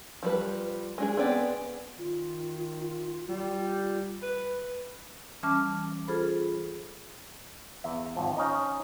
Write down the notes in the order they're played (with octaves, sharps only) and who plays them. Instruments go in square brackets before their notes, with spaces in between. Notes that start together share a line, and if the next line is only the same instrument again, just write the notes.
[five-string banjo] F3 G3 B4
G#3 D4 G#4
B3 C4 G#4 D5 G5
[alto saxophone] D#3 [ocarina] F4
[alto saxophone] G3
B4
[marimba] E3 G3 C#4 A5 D6 F6
F4 G#4 A4 C5 B5
[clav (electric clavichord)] E2 E5
G#1 F3
C#4 D#4 D#5